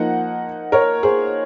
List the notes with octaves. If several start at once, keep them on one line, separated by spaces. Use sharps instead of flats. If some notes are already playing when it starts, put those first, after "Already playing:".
Already playing: F3 A#3 D#4 F#5
A#4 C#5
G#4 C5